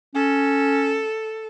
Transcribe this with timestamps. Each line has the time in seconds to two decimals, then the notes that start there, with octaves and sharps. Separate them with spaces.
0.15 C#4 A4